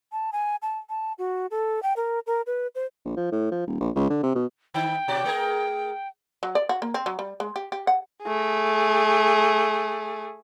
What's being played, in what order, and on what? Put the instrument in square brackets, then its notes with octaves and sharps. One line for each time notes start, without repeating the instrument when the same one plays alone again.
[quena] A5
G#5
A5
A5
F#4
A4
G5
A#4
A#4
B4
C5
[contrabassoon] A#1
F3
A2
F3
D#1
A#1
C#2
D3
C3
B2
[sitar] D#3 D#4 [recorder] G5
[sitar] B2 F#4 D5
A3 G#4 A#4
[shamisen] F#3
D5
F#4
A#3
C4
F#3
G3
G#3
G4
G4
F#5
[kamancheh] A3 G#4